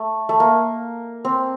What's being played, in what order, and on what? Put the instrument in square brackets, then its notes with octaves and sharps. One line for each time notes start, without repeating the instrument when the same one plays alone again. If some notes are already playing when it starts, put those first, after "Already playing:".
Already playing: [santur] A3
A3
A#3
C4